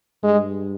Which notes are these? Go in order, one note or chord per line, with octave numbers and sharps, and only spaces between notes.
G2 G#3